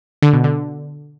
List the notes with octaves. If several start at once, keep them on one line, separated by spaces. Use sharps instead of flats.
D3
B2
D3